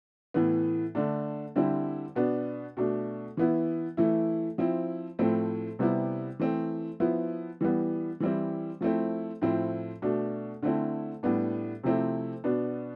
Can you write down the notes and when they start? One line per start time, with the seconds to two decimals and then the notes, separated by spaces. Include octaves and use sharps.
0.34 A2 E3 B3
0.95 D3 A3 D4
1.56 D3 G3 C4 E4
2.16 B2 B3 D4
2.77 B2 A3 D4
3.37 E3 B3 E4
3.97 E3 A3 E4
4.58 F3 C4 E4
5.19 A2 F3 A3 C4 E4
5.79 C3 G3 B3 E4
6.39 E3 A3 C4
7.00 F3 B3 E4
7.61 E3 G3 B3
8.20 E3 G3 C4 E4
8.81 F3 A3 C4 E4
9.42 A2 F3 C4 E4
10.02 B2 A3 D4
10.63 D3 A3 C4 E4
11.23 A2 G3 B3 D4
11.83 C3 F3 A3 C4 E4
12.44 B2 B3 D4